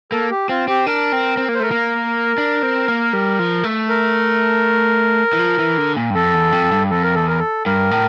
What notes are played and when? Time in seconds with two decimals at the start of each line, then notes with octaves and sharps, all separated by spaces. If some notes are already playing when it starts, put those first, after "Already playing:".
0.12 A#3 A4
0.30 G4
0.49 C4 F4
0.68 C4 G4
0.87 D4 A#4
1.12 C4
1.37 C4
1.48 A#3
1.54 C5
1.60 A3 A#4
1.71 A#3
2.38 D4
2.63 C4
2.88 A#3
3.13 G3
3.39 F3
3.64 A3
3.89 A#4
5.33 E3
5.39 F3
5.59 E3
5.77 D3
5.96 A#2
6.10 G2
6.15 F2 A4
6.34 E2
6.52 F2
6.72 G2
6.90 F2 A4
7.03 A#4
7.15 E2 A4
7.28 A#4
7.39 A4
7.66 G2 A#4
7.91 A2